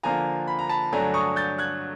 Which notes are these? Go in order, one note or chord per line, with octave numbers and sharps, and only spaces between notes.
D3 F3 A#3 D4 F4 G#5 A#5
B5
A#5
A5 B5
G2 D3 F#3 A3 D4 G#5 A#5
C#6 D#6
G6 A6
F#6 G#6